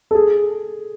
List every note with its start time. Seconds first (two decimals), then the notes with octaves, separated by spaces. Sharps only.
0.11 A4
0.15 G#4